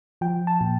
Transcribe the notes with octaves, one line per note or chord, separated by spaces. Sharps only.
F3 G5
A5
A#2